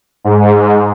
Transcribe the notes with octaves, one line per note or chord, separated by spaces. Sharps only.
G#2